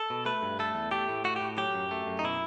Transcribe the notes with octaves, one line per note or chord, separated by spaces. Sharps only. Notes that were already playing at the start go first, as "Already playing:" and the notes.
Already playing: A4
B2
A3 B4
G2
A3 A4
E2
A3 G4
A2
A3 F#4
G4
A2
F#3 G4
F#2
A3
F#2
D#4
B2 E4